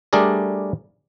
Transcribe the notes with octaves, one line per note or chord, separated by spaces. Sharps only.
G3 A3 D4 G#4 A#4 D5